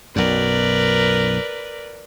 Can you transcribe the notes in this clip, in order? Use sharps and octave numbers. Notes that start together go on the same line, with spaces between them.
B1 F#2 A#4 B4 D5